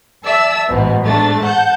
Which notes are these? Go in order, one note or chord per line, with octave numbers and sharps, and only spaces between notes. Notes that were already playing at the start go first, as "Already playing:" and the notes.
D5 E5 A5 E6
A1 G#2 B2
G#2 A3 D4 A6
F#5 A5 G6